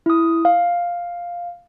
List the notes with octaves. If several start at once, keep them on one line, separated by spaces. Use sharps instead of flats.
E4 D#6
F5